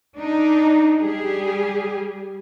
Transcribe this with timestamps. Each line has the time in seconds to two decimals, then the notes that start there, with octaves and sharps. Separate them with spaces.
0.15 D4 D#4
1.00 G3 G4 G#4